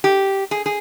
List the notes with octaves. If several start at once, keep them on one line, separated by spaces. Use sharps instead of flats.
G4
G#4
G#4